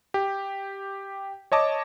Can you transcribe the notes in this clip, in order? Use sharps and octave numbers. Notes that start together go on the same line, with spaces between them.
G4
C#5 D#5 A5 D6